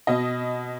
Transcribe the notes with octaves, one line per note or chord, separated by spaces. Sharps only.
B2 D#5